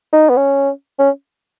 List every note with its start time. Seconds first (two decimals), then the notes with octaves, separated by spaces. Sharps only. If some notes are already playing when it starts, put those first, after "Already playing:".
0.13 D#4
0.29 B3
0.37 C#4
0.99 C#4